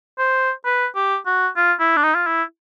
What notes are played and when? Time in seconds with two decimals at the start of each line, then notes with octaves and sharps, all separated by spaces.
0.18 C5
0.65 B4
0.95 G4
1.26 F#4
1.56 F4
1.80 E4
1.97 D4
2.03 D#4
2.15 F4
2.27 E4